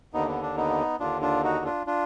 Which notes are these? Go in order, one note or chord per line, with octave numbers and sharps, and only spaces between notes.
D#2 D3 B3 D#4
B3
D4
B3 D#4
D#2 D3 D4 F4
D4 F4
D#4 F#4
D4 F4
D4 F4